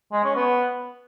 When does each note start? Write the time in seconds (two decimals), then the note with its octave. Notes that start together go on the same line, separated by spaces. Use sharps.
0.12 G#3
0.24 C#4
0.36 B3